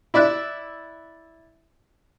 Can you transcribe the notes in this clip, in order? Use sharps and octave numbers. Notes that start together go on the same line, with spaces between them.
E4 D5 E5 F#6